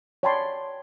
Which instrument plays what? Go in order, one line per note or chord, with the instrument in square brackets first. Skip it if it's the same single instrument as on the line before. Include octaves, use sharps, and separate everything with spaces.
[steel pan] C#5 D5 G5 A5 B5 C6